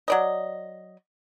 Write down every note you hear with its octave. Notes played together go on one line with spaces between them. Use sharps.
F#3 D5 D#5